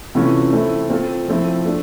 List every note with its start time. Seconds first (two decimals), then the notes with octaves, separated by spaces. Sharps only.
0.15 C3 E3 A3 C#4 F4
0.53 A3 C4 E4 A4
0.90 A3 C4 F4 A4
1.28 F3 A3 C4 E4 A4
1.66 A3 D4